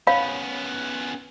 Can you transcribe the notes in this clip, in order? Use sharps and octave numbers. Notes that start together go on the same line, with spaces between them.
B3 C#4 C#5 F5 B5